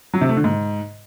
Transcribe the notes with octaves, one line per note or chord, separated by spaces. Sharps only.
F#3
C3
A3
D3
G#2